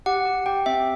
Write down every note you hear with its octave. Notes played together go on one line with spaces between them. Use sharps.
G4 F#5
G4
G4 G5
C4 E5